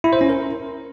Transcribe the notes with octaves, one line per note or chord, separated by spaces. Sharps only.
E4
C5
C#4
A#4